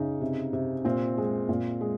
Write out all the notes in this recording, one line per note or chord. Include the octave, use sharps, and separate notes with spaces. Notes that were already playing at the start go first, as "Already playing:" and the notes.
Already playing: C#3 D#4
C3
C3
A#2 C4
G#3
A#2
G#3